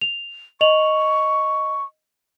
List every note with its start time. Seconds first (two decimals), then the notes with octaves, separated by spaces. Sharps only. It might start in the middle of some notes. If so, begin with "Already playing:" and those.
0.01 F7
0.61 D#5 C#6 F7 F#7